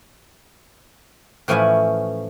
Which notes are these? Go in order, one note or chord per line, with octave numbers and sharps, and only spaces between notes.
A2 E3 F3 C#4 G#5 B5